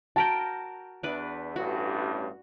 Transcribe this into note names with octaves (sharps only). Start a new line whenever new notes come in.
F#4 A#4 G5 A5
E2 D4 B4
A1 G2 F#4